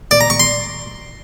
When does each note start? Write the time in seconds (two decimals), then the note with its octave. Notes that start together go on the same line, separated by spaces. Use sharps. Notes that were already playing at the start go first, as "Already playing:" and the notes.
0.11 D5
0.21 A#5
0.30 C#6
0.40 C6